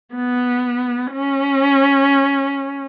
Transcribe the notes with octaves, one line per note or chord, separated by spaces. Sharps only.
B3
C#4